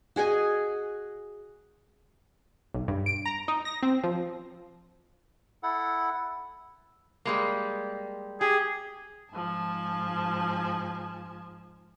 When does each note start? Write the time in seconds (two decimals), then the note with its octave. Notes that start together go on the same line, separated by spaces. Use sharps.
0.16 F#4 G#4 D#5 G#5
2.74 B1
2.88 G2
3.06 D7
3.26 A#5
3.48 D#4
3.65 A#6
3.83 C4
4.04 F3
5.63 E4 A4 F#5
7.25 G3 G#3 A#3
8.41 G4 G#4
9.32 G#2 F3 G#5 A5